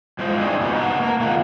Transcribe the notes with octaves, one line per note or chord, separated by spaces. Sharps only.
E2 A2 G#3 F4 C5 D#5
G#3 C4 D4 E4 F4 G#4
F2 B2 B3 D#4
C3 B4 F#5 A5
A#3 A#5
B2 D#3 F4 G#4 F#5